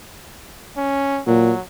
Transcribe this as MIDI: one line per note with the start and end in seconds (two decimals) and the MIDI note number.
0.77 1.21 61
1.27 1.53 46
1.27 1.61 54